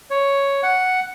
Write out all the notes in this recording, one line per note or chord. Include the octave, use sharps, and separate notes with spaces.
C#5
F#5